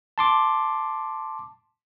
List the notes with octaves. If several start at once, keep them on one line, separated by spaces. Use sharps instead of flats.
A5 C6 D6